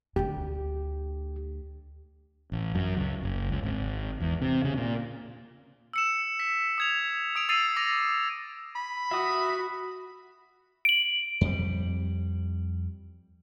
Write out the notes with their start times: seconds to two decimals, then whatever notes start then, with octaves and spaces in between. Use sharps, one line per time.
0.16 D2 D3 G4
2.52 A1
2.75 F#2
2.97 C#2
3.23 F#1
3.49 C#2
3.63 G#1
4.20 E2
4.42 C3
4.65 C#3
4.77 A#2
5.93 E6 C#7 E7
6.40 B6
6.78 D#6 G#6 F7
7.36 D#6 D7 F7
7.49 D#6 E6 A6 C7 D#7 F7
7.76 D6 A#6 F7
8.75 B5
9.11 F#4 E5 D#6
10.85 D7 F#7
11.41 F2 G3